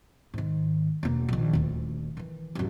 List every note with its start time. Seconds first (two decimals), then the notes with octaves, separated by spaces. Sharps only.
0.34 G#2 D#3
1.03 E1 A#3
1.29 A#1 D#3
1.53 D#1 D2
2.17 D#3 E3
2.55 A1 F#2